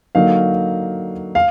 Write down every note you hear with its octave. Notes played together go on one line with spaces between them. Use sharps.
D3 F#3 A#3 D#4 F5
F5